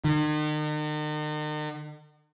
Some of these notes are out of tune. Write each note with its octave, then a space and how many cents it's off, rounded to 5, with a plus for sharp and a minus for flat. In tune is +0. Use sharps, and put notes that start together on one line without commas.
D#3 -45